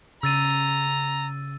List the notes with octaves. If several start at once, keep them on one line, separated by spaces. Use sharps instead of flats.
C#3 A#5 E6 A6 D#7